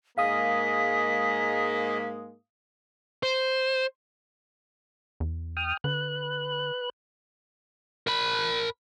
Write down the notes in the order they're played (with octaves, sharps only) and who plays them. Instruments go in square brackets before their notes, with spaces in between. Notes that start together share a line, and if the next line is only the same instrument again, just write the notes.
[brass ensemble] G#2 G#3 A#3 [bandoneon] G#4 D#5 [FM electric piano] F5 D#6 [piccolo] B6
[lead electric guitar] C5
[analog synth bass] E2
[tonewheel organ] G5 D#6 F6
[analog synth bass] D3 [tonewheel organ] B4 F#6
[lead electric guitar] A#4 B5